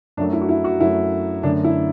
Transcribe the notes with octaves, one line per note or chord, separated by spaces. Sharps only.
F#2 F#3 A3 D4
E4
F#4
E4
F#4
F#2 F#3 A3 E4
F#2 D3 A3 D4
E4